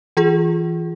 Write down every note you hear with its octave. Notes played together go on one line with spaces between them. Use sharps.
E3 F4 G#4